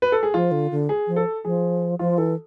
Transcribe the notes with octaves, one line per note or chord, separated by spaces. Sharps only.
B4
A4
G#4
F3 F4
D3
D3
G#4
F3
A4
F3 G#4
F3 F4
E3 A4